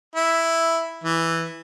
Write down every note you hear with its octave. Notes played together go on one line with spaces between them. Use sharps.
E4
E3